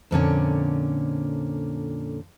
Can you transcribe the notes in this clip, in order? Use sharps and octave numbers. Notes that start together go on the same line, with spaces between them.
F2 A#2 D3 C#4